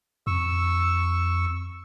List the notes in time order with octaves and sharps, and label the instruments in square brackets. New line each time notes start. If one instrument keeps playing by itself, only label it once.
[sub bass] F2 [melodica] C#6 E6